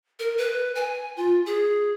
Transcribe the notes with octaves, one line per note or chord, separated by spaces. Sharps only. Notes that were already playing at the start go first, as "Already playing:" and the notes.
A#4
B4
G#5
F4
G#4